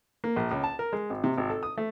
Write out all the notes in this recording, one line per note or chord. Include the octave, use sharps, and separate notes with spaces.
A#3
A#1
C#2
A5
A#4
G#3
G#1
C3
G#1
A4
D#6
A3